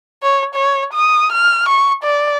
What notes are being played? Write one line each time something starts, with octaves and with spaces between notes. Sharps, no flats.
C#5
C#5
D#6
F6
C#6
D5